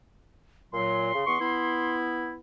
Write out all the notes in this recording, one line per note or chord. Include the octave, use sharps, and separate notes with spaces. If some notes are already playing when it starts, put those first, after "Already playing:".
A#2 F#3 C6
C#3
E2 B3 C#6
B3 E4